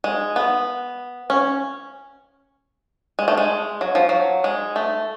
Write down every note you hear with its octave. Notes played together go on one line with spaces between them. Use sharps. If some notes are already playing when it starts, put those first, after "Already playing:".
G#3
B3
C#4
G#3
A3
G#3
F#3
F3
F#3
G#3
A3